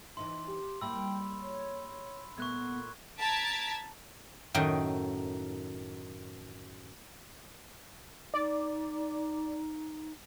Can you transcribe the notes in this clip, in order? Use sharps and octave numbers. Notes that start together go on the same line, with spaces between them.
E3 D#4 E4 C6
G4
G3 A#3 E4 G5 B5 E6
C#5
A#2 A3 B3 C#6 F#6 G#6
A5 A#5 G#6 A6 B6 D7
F#2 A2 D#3 D#5 G5
D#4 D5